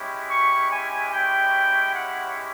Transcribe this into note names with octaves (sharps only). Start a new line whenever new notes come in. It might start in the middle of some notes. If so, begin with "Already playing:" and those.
Already playing: G#3 C#4 E4 G4
C#6
G#5
G5
F#5